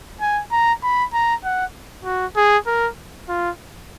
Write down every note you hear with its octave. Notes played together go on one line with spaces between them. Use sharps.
G#5
A#5
B5
A#5
F#5
F#4
G#4
A#4
F4